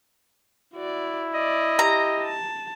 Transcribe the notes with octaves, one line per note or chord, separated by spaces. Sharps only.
E4 F#4 D5
D5 D#5
G4 A#5
A5